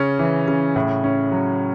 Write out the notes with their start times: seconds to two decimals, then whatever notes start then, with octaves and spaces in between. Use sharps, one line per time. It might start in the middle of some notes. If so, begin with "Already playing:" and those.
Already playing: C#3 C#4
0.19 E3
0.48 C#3
0.76 A2
1.04 C#4
1.32 F#3